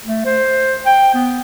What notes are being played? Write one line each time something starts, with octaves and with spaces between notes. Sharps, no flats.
A3
C5
G5
B3